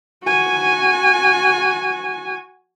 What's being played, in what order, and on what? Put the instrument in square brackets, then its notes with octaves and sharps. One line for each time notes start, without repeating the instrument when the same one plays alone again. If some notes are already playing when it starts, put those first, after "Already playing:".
[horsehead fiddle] F#4 G#5